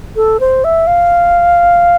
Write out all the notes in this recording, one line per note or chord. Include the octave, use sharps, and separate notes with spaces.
A4
C5
E5
F5